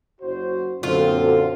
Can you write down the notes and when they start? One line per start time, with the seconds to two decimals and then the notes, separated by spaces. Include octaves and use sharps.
0.21 F#1 F#4 C5
0.83 F#2 A#2 D3 C4 F4 F#4 A4 C5